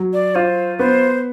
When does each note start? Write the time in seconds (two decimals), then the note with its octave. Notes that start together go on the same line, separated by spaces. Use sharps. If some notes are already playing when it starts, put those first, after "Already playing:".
Already playing: F#3
0.13 D5
0.35 F4 C5
0.79 B3 C5